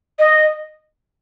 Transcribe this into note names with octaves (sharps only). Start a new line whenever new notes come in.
D#5